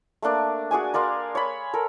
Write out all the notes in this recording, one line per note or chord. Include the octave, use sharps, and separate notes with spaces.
A3 A#3 D4 D5
F#4 G#4 D5 G#5
A#4 D5 F5 C6
C#5 B5
A4 A#4